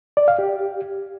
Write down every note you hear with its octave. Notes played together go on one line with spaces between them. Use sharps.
D5
F5
G4